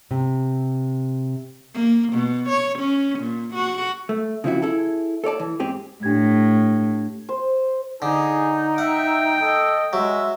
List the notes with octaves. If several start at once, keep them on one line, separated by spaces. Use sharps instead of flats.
C3
A#3
B2
C#5
C#4
A#2
F#4
A3
C#3 F3 C4 E4 F#4
E4 G#4 A4
A4 C#5 D5 A5
E3
G#2 C4 G4 G#4
A2 D4 G4 G#6
C5
D3 D#4 G#4
E5 F#5 G5
A4 D#5
F#3 G#3 E5